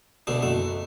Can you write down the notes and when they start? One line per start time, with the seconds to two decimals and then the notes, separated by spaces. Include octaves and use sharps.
0.27 D2 B2 A3
0.42 F#1 A3 F#4 E5